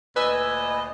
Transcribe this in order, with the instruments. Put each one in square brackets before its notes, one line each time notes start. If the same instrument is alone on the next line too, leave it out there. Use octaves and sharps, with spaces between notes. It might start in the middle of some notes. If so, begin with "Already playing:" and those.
[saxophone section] D2 A#2 D#5 [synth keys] B4 G#5 E6